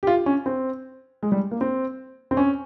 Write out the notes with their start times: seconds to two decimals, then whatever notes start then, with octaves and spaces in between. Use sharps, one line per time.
0.03 G4
0.07 F4
0.26 C#4
0.46 C4
1.23 G#3
1.32 G3
1.51 A#3
1.61 C4
2.31 C4
2.37 C#4